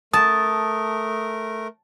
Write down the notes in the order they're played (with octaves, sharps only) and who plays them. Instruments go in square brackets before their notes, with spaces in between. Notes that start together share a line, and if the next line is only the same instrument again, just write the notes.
[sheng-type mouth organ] A3 A#4 [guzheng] A5 [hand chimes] D#6